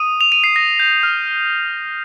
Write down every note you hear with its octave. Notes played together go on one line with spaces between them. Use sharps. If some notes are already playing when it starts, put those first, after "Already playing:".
Already playing: D#6 D#7
F7
D#7
C7
A#6
G6
F6